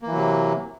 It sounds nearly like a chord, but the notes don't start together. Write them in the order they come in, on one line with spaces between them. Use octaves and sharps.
A#3 E3 F#3 C3